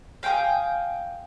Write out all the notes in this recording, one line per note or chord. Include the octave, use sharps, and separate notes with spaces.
F5 G5 G#5 D#6